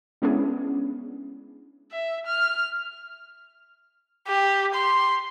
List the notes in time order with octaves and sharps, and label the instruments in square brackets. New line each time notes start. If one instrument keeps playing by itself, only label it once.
[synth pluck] G#3 B3 C#4 D4 E4 G#4
[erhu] E5
F6
G4
C6